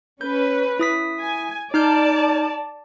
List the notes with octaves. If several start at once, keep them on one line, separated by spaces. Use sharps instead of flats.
C#4 B4 G6
E4 D#6 B6
G#5
D#4 D5 A5 F6 G6